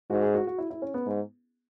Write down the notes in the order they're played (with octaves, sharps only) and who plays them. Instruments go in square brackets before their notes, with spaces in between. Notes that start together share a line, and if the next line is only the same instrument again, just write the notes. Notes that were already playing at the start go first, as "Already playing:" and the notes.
[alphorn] G#2 [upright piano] F#4
[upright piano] G#4
F#4
F#4
E4
E4
C#4
B3
[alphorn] G#2